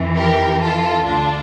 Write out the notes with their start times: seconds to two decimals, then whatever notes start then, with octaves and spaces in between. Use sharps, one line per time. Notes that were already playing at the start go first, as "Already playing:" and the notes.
Already playing: F2 E3
0.17 G4 A#4
0.62 F4 A4
1.07 D2 D3 D4 F4